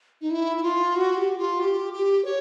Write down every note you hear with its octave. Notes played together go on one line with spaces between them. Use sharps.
D#4
E4
E4
F4
F#4
G4
F4
G4
G4
C#5